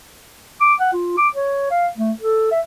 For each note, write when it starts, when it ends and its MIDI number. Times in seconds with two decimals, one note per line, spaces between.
0.60 0.74 86
0.79 0.93 78
0.93 1.17 65
1.17 1.28 86
1.35 1.67 73
1.71 1.87 77
1.98 2.12 57
2.21 2.51 69
2.51 2.60 76